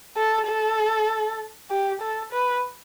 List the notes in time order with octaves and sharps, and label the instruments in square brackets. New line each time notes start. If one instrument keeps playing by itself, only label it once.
[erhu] A4
A4
G4
A4
B4